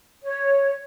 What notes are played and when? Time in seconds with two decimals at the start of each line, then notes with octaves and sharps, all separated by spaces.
0.23 C#5